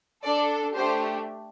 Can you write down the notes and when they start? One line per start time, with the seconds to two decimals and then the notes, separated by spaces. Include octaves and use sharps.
0.24 D4 A4 D5
0.75 A3 D4 G4 C5